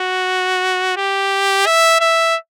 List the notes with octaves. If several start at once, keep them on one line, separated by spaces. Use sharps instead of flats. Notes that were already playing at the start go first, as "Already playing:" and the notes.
Already playing: F#4
G4
E5
E5